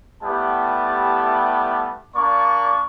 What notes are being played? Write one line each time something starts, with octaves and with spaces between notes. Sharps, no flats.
G3 A3 B3 E4 G4 A5
A#3 D4 D5 C#6